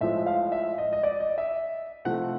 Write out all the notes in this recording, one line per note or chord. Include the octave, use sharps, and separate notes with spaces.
A2 F3 G#3 E5
F5
E5
D#5
D#5
D5
D#5
E5
C3 F3 A3 F#5